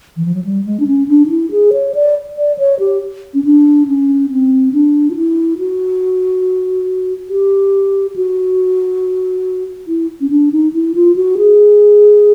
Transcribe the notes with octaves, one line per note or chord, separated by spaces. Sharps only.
E3
F3
F#3
G3
G#3
D4
C#4
D4
D#4
E4
G#4
C#5
D5
D5
C#5
G4
C#4
D4
C#4
C4
D4
F4
E4
F#4
G4
F#4
E4
C#4
D4
D#4
E4
F4
F#4
G#4